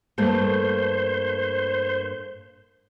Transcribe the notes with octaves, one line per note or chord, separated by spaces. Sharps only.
G2 A3 A#3 C5